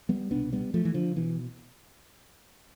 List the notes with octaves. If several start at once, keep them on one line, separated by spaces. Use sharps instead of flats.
G3 B3
C2 B2 B3 D4
G3 B3
F3 A3
E3
D3 F3
B2 E3